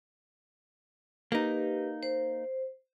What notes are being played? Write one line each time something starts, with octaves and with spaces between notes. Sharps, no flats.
A#3 D#4 G4 B4
C5